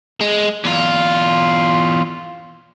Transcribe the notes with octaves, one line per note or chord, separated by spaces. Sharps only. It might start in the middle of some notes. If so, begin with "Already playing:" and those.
G#3
E2 F4